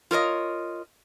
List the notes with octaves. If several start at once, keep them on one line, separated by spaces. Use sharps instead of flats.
F4 A#4 C#5 D#5